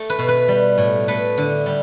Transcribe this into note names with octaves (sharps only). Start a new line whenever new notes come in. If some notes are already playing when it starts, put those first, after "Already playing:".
Already playing: A3
B4
B2
B4
G3
A2
A3 B4
D3
G3